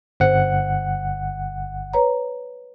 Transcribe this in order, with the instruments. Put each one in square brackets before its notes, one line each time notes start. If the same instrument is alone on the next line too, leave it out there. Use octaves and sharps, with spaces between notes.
[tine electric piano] G1 F#5 [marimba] C5
[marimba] B4 C#5 A#5